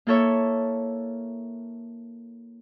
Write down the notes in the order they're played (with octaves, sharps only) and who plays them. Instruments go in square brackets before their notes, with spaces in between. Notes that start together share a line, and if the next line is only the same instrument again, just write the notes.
[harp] A#3 E4 A4 C#5 E5